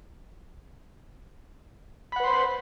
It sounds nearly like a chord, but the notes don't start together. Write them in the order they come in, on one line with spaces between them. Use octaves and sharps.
B5 F#5 B4 C6 C5